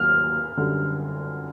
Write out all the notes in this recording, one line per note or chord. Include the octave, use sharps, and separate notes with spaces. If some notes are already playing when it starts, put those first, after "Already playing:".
Already playing: D#2 D#3 F#3 F6
F#2 D3 G3